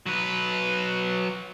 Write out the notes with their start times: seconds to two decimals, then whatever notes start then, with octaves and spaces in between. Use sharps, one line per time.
0.06 F#3 B4